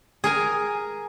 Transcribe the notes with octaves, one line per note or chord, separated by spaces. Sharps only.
G#4 A#4 G#5